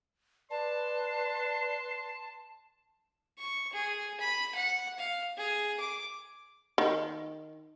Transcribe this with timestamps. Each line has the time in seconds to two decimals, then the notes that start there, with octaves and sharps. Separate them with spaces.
0.51 B4 D5 A5 C6
3.38 C#6
3.73 G#4
4.20 B5
4.55 F#5
4.99 F5
5.37 G#4
5.80 D6
6.78 D#3